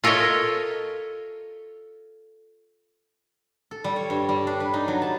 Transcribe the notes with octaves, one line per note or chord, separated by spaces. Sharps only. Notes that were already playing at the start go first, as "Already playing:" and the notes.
F4 A4 A#4 C#5 D#5 E5
A4
G3
C#5
G2
G3
D4
B4
D#4
F#3
A5